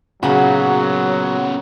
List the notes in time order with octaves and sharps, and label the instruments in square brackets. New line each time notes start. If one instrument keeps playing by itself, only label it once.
[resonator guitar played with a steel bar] A#2 F#4 [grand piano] C#3 [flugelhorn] F#3 [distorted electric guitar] B3 C#4